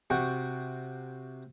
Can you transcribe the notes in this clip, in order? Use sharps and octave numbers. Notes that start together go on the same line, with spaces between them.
C3 F#4 G5 C#6